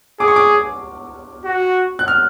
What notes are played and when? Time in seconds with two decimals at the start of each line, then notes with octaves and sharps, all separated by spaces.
0.20 G#4 D6
0.28 C#6
0.36 D6
1.45 F#4
1.99 F#6
2.08 F6